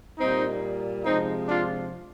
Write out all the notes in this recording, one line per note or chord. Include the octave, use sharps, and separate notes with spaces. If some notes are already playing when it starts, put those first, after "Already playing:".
A#2 G3 A#3 C4 D#4
C3 F3 G#3 C4 D#4
D4 F4